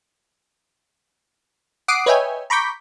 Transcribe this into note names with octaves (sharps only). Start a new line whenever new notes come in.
F#5 D6 D#6 C7 D7
B4 C#5 D#5 E5 G5 G#5
A#5 B5 C#6 D6 G6 B6